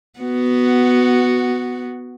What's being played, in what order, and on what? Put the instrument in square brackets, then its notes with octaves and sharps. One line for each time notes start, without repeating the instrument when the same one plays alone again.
[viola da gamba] B3 F#4